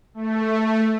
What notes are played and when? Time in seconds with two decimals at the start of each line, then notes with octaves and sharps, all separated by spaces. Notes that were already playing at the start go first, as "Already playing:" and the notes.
0.14 A3